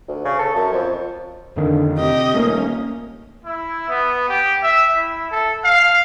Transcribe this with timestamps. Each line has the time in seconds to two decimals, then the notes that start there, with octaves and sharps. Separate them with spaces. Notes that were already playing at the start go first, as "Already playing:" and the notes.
0.08 D2
0.25 C#3
0.39 A4
0.55 F#2
0.73 F2
1.56 F2 D3 D#3
1.98 C3 G4 D#5
2.34 D#1 A3 A#3 C#4
3.45 E4
3.89 B3
4.29 G4
4.63 E5
4.95 E4
5.31 A4
5.64 F5